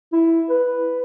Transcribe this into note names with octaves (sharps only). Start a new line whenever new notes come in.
E4
B4